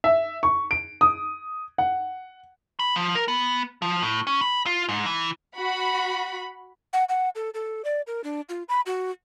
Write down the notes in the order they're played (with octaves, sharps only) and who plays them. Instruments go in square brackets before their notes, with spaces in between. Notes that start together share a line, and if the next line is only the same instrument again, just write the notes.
[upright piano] E5
C#6
D7
D#6
F#5
[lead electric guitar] B5
F3
A#4
B3
F3
A2
C#4
B5
F4
G#2
E3
[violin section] F#4 B5
[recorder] F#5
F#5
A4
A4
D5
A#4
D4
F4
B5
F#4